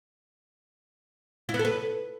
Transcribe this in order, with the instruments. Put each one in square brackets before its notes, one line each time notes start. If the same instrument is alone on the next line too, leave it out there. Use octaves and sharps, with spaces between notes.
[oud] E4
B3
A4
B4